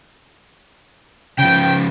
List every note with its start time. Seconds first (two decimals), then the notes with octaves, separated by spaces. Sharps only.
1.39 C#3 F3 G5